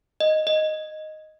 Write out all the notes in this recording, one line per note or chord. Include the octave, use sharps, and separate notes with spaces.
D#5
D#5